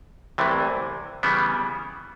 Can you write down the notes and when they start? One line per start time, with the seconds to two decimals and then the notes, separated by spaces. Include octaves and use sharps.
0.38 C2 C3 E3 A3
1.23 C#3 E3 G3 B3